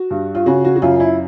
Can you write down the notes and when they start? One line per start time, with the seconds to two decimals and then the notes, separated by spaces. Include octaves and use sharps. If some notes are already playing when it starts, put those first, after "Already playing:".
Already playing: F#4
0.10 G2
0.35 F4
0.46 C#3 F#4
0.65 F#4
0.76 F#4
0.82 F#2 F4
1.00 E4